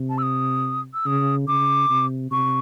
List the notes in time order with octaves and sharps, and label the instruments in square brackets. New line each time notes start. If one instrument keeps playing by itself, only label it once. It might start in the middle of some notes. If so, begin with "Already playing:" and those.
Already playing: [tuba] C3
[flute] A5
E6
D#6
E6
[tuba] C#3 [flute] D#6
[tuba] C#3 [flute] D6
[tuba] C3
[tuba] C3 [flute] C#6